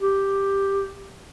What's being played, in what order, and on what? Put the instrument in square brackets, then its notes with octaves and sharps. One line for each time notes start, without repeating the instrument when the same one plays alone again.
[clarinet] G4